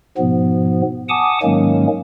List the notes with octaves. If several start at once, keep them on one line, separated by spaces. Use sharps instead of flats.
G#2 B2 F3 B3
F#5 G#5 A5 D6 D#6
G#2 D#3 F#3 G#3 A#3 C#4